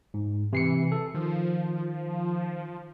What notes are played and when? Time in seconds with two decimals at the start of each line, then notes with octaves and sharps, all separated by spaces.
0.14 G#2
0.53 C3 E3 C7 C#7
0.92 A4
1.14 D#3 F3